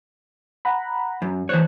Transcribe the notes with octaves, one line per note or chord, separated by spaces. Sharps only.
F#5 A#5 B5
F#2
E3 C5 C#5 F#6